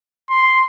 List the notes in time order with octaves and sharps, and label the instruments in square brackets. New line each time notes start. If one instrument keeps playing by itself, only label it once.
[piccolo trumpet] C6